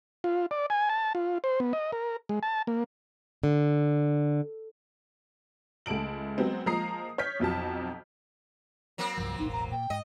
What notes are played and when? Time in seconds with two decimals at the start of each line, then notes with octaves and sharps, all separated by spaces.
0.24 F4
0.51 D5
0.70 G#5
0.89 A5
1.15 F4
1.44 C5
1.60 B3
1.73 D#5
1.92 A#4
2.29 G#3
2.43 A5
2.67 A#3
3.43 D3
5.86 C#2 A3 A5 D7 F#7
6.38 F#3 G#3 B3 C4
6.66 F3 G#3 A#3 A#5 D#6 C7
7.18 C#5 F6 G6 B6
7.40 B1 F2 F#3 A5
8.98 F#3 A#3 C4
9.17 C2 G2 F3
9.39 E1 A1 D#4
9.53 A#5
9.72 A#2 G5
9.90 G#2 D#5